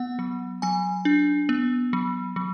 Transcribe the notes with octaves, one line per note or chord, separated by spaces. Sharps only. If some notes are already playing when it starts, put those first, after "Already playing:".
Already playing: B3 F#5
F#3
F#3 G#5
D4
B3
F#3
F#3